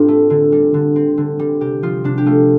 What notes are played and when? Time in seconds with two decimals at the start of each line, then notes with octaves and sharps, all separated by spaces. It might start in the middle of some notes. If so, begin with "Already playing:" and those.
Already playing: A2 C4 D4 F4 G4
0.08 A3
0.30 D3
0.52 G3
0.74 D3
0.96 C4
1.17 D3
1.39 G3
1.60 C3 G4
1.82 F3 F4
2.04 C3 D4
2.18 G4
2.26 A3 F4